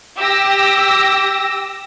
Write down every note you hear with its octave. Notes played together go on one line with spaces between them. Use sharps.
G4 E6 A#6